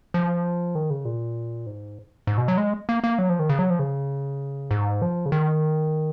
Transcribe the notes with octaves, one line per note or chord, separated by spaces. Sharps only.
F3
D#3
C#3
A#2
G#2
G#2
B2
F#3
G#3
A#3
A#3
F#3
F3
D#3
C#3
F#3
F3
C#3
G#2
F3
C#3
D#3